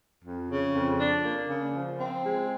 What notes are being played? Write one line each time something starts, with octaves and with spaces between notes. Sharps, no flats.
F2
C#3
F2
D4
A#3
C#3
F3
C4
G#3